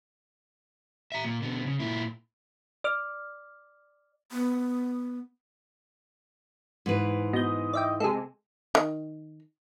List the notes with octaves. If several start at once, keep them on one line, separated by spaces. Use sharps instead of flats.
E5 A#5
A#2
B2 D3
C#3
A#2 E4
D5 D6 F6
B3
G#2 E3 B4
B2 D#5 G6
D5 E5 G5
C3 G#3 G#4 A4
D#3